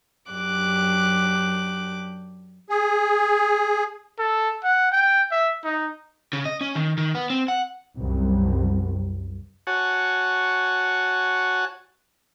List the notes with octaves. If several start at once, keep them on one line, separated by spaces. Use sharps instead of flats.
F#2 D4 G4 D6 F#6
G#4
A4
F#5
G5
E5
D#4
C#3
D#5
C#4
D#3
D#3
B3
C4
F#5
C2 F#2
F#4 C#5 F#5 G#5 A5